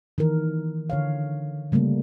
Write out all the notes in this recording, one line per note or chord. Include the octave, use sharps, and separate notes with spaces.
D#3 E3 A#4
D3 C#5 F5
C#3 G3 A3 A#3